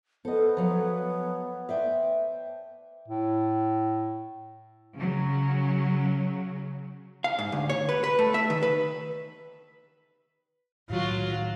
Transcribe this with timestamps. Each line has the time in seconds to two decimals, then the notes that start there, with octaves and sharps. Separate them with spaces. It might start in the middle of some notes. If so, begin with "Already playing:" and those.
0.25 B3 A4 C5 D#5
0.57 F3 F#3 A4 C#5 A5 E6
1.69 B4 C5 D5 E5 G5
3.08 A2
4.97 C#3 F#3
7.24 F5
7.39 G#2
7.52 D2
7.70 C#5
7.89 B4
8.04 B4
8.19 A3
8.34 E5
8.50 D#3
8.63 B4
10.90 A2 D#3 F#3 F4 F#4